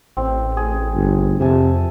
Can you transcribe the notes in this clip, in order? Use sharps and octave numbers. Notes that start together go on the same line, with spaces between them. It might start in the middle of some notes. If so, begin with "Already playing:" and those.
A1 C4
G#4
G1
F2 C3 E5 G#5 A5